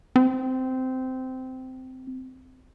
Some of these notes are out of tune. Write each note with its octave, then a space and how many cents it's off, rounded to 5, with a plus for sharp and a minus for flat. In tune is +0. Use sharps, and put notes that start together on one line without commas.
C4 -15